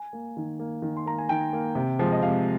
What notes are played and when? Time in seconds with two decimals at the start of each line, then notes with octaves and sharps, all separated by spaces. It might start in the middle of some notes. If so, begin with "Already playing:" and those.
Already playing: G#5
0.13 A#3
0.37 D#3
0.59 A#3
0.82 D#3
0.97 C6
1.06 A#3 A#5
1.18 G#5
1.29 D#3 G5
1.53 A#3
1.75 C3
1.99 F3 G#3
2.12 D#5
2.22 C3 F5